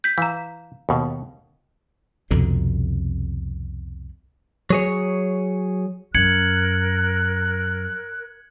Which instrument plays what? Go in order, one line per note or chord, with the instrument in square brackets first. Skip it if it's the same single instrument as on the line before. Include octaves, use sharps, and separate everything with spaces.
[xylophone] G6 B6
[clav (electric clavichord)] E3 [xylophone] F5 A#5
[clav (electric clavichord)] D#2 B2
[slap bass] C2 F2 B2 D3
[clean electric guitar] F#3 G#4 C#5
[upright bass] F#2 [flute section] A#4 F#6 [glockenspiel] G#6 C#7 F#7